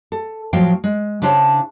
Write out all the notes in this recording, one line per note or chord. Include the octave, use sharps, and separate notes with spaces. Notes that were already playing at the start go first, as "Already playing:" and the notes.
A4
A2 F3 F#3 F5 G5
G#3
C#3 D4 E4 C5 C#5 A5